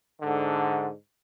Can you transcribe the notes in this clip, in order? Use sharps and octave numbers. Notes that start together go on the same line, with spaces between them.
G#2 D3